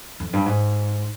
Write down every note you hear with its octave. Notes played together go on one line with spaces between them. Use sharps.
F2
G2
G#2